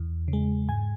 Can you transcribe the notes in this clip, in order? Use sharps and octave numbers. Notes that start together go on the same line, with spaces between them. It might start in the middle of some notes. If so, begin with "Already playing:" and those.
Already playing: E2
C#3
G#3
G#2 G#5